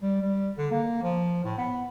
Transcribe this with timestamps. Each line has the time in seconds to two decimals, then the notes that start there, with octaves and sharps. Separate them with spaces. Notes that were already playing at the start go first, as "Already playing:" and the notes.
0.02 G3
0.21 G3
0.58 D3
0.71 A#3
1.02 F3
1.44 A2
1.58 B3